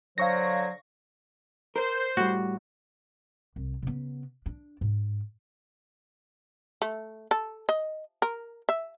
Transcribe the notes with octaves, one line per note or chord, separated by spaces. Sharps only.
D3 F#3 C5 F5 C#6 A#6
A#4 C5
A2 G3 F#4
C2
C#3 B3
D4
G#2
A3
A4
D#5
A#4
E5